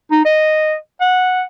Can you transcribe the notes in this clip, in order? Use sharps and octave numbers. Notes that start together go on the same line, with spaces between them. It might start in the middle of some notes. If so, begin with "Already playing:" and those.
D#4
D#5
F#5